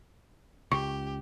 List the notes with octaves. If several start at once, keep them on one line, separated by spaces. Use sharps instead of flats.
C#2 G4 C#6